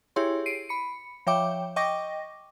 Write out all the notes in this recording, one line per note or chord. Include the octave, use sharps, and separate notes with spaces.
E4 G4 G#4 C#5 C6
C7 D7 D#7
B5 C#7
F3 C#5 E5 G5 D6
D#5 G5 C#6 D6 A#6